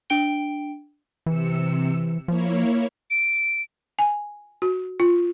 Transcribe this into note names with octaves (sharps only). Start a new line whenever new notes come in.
D4 G5 D7 G7
C3 E3 E6 C#7
F3 A#3 E4 C#5
D7
G#5
F#4
F4